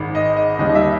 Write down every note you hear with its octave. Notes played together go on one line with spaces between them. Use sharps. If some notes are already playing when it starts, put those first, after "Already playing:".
Already playing: G#1 G#2 D#3
D#5
D#5
D#2 D#3 G3 D#5
D#5
E5